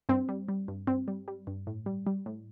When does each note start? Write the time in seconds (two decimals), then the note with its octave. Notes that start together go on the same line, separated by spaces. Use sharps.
0.09 G2 C4
0.29 G3
0.49 G3
0.68 G2
0.87 G2 C4
1.08 G3
1.28 G3
1.47 G2
1.67 A2
1.86 G3
2.07 G3
2.26 A2